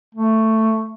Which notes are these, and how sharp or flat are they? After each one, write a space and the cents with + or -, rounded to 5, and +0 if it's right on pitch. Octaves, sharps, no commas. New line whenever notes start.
A3 +10